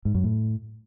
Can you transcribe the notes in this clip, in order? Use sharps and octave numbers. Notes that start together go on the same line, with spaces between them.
G#2
F#2
A2